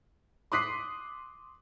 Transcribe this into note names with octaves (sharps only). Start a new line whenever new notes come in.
C6 D6 D#6 F#6 B6 C7